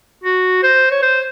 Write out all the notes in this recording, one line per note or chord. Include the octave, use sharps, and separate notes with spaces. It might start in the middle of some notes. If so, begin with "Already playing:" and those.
F#4
C5
C#5
C5